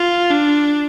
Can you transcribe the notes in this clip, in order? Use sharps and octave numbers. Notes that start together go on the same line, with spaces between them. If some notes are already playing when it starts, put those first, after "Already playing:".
Already playing: F4
D4